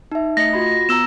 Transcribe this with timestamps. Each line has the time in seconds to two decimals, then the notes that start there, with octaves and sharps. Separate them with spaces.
0.12 D#4 E5
0.37 A3 D#5 A#6 C#7
0.53 F4 F#4 B5
0.89 B3 A#5 E6 E7